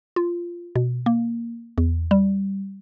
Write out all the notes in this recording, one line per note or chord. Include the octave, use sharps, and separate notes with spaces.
F4
B2
A#3
E2
G3